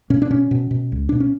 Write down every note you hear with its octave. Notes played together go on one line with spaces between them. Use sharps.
B2 C#4
D4
B2 C#4
B2
B2
C#2
B2 D4
C#4